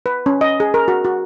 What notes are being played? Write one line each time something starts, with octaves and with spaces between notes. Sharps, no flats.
B4
C#4
D#5
G#4
A#4
F#4
F#4